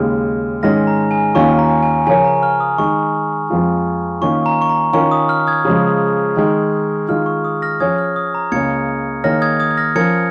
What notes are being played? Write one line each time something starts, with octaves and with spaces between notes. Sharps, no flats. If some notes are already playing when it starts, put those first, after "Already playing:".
Already playing: D#2 C#3 G#3 F6
G#2 D#3 G#3 C#4 G#4 F6 A#6
A#5
G#5
D#2 D#3 C#4 F4 C#6
A#5
G#5
C#3 F3 C#4 A#4 C#5 G#5
A#5
F6
D#6
D#3 G#3 D#4 C#6
F2 F3 G#3 F4
D#3 A#3 C#4 F4 C#6
A#5
C#6
A#5
D#3 C#4 F4 A#4 C#6
D#6
F6
D#6 G#6
C#3 F3 G#3
D#3 G#3 D#4
D#3 G#3 F4 F6
C#6
D#6
F6 A#6
F3 C#4 G#4 C#5 D#6 G#6
F6
D#6
A#5
C#2 C#3 A#3 C#4 G#6 C#7
D#3 A#3 D#4 G#4 C#5 F6 A#6
D#6 G#6
D#6 G#6
G#6
F6 A#6
F3 C#4 A#4 G#6 C#7